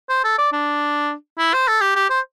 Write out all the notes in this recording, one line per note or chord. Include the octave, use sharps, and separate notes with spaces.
C5
A4
D5
D4
E4
C5
A4
G4
G4
C5